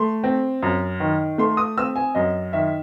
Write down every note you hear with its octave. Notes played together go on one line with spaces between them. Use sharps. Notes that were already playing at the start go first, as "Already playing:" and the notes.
Already playing: A3 C6
C4
F#2
D#3
A3 C6
D#6
C4 E6
G#5
F#2 D#5
D#3 E5